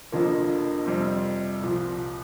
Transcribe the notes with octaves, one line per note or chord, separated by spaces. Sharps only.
F1 F2 D3 F3 A#3
F2 C3 G3 C4
C2 A#2 F3